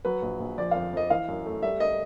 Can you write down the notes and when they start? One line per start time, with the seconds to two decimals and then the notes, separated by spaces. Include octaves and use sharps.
0.05 F#3 B4
0.22 A#1
0.40 A#1
0.58 F3 D5
0.71 F2 F5
0.93 F2 D#5
1.10 E3 F5
1.29 F#2
1.46 A3
1.62 G3 E5
1.80 D#5